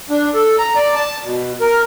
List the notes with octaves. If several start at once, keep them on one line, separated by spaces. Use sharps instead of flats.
D4
A4
A#5
D5
A5
B2
A#4